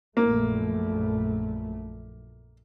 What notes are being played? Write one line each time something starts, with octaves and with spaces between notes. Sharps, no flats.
A#1 F#2 A3 A#3